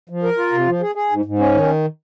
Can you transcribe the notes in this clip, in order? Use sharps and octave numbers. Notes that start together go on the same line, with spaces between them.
F3
A#4
F4
C3
F3
G#4
G#4
G#2
G#2
C#4
D#3